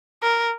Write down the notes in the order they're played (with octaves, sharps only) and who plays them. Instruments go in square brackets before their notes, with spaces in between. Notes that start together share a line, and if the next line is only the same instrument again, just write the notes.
[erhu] A#4